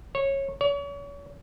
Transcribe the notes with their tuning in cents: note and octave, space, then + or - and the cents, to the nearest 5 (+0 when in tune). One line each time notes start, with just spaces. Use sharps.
C#5 -15
C#5 +40